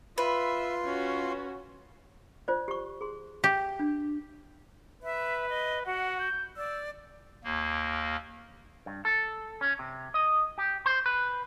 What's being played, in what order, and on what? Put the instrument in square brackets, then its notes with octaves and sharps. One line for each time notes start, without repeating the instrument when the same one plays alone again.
[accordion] F4 C6 [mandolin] B4 [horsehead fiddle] E5
[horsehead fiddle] C#4 F#4
[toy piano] F4 C5 D5
G4 C#6
G#4 C6
[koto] G4 [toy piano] E5
[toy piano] D4
[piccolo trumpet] B4 [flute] E5
[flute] D#5
[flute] F#4 [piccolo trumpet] F#5
[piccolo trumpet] G6
[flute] D5 [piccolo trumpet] E6
[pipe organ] D#2 A#3
[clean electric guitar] G2
A4
C#4
C3
D#5
G4
C5
B4